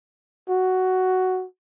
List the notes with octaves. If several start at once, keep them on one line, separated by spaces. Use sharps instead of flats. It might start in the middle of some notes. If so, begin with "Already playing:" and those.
F#4